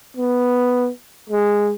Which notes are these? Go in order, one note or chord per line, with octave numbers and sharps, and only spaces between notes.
B3
G#3